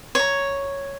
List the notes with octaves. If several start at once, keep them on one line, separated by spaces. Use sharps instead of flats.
C#5 A#5